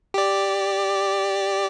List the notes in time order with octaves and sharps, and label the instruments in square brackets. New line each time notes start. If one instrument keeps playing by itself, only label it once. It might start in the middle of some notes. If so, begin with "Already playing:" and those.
[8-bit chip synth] G4 D5